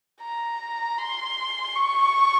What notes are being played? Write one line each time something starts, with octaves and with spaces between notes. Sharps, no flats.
A#5
C6
C#6